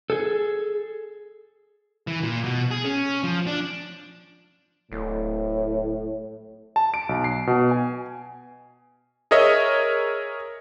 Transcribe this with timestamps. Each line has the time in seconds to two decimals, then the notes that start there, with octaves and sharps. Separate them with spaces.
0.10 G#4 A4
2.07 E3
2.23 A#2
2.44 B2
2.71 G#4
2.85 C#4
3.24 F3
3.47 D4
4.92 D1 A2
6.76 A5
6.94 D7
7.09 B1
7.24 C7
7.47 B2
7.71 G#5
9.31 G#4 A#4 C#5 D#5 E5